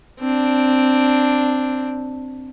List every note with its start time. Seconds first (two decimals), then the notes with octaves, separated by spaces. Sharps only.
0.20 C4 D4